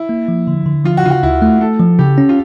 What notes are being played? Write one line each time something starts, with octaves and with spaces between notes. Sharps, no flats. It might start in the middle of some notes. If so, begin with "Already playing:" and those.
Already playing: E4
A#3
F3
D3
D3
F3 F4
F#4
C#3 F4
F#4
D2 E4
A3
A3 A4
F3
C#3 G4
C#4
F4